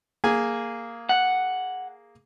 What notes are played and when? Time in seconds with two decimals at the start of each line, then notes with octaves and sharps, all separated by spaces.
0.24 A#3 G#4 G#5
1.09 F#5